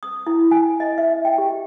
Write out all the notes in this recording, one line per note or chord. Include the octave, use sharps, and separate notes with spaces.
D#6
E4
G#5
D#5
E5
G5
G4